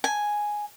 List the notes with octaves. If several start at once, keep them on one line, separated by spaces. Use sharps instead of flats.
G#5